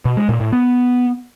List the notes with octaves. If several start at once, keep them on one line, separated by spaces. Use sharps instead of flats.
B2
G#3
A#2
A2
B3